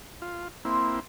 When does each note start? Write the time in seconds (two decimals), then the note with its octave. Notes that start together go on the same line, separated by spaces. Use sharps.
0.22 F4
0.65 A#3 C4 E4 C6